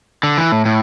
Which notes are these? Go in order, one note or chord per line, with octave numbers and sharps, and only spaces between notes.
D3
E3
A2
A2